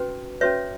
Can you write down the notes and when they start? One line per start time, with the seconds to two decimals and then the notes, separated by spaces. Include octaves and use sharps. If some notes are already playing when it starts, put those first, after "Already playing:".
Already playing: C#4 F#4 B4
0.41 C#4 F#4 B4 C#5 E5